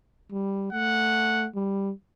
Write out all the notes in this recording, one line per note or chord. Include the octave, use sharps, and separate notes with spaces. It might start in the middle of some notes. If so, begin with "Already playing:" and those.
G3
A3 F#5
G3